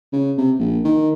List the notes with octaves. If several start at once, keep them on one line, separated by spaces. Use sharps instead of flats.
C#3
C3
A#1
D#3